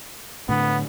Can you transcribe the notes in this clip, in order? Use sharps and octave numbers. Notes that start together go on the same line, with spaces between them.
A2 D3 B3